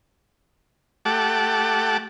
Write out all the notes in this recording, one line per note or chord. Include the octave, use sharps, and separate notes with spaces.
A3 G4 F#5 A5 D6